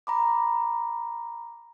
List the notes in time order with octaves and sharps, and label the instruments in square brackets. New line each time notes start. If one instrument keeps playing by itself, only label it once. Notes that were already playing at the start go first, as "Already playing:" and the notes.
[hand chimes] A#5 B5 D6